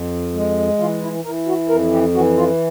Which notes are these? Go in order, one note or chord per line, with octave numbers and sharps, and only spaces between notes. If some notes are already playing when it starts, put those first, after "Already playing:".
Already playing: F2
G#3
E3 F4
E4
E3 A#4
F#4
F2 A#4
G4
E3 F#4
F4